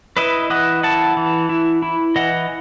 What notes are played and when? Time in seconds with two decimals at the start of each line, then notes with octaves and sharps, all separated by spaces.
0.17 E4 B4 D#5
0.50 E3 D#5 F#5
0.83 E4 F#5 A5
1.17 E3
1.49 E4
1.82 E4
2.16 E3 D#5 F#5